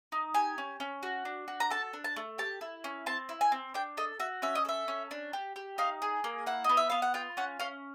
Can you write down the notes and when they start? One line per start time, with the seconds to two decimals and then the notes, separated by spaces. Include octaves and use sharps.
0.12 D#4
0.34 G4 G#5
0.58 C#4
0.80 C#4
1.03 F#4
1.25 D4
1.48 F#4
1.60 A#5
1.70 A4 A5
1.93 D4
2.04 A5
2.16 A3
2.38 G4 A5
2.61 E4
2.84 C#4
3.06 C4 A5
3.29 E4
3.41 G#5
3.52 C4
3.74 D4 G5
3.97 A4 D#5
4.20 F#4 E5
4.42 C#4 E5
4.55 D#5
4.65 A4 E5
4.88 C#4
5.11 D4
5.33 G4
5.56 G4
5.78 D#4 F5
6.02 G#4
6.24 A#3
6.46 E4 F#5
6.64 B3 D#5
6.77 E5
6.90 B3 F5
7.02 F#5
7.14 F4 G5
7.37 C#4 F#5
7.60 C#4 F5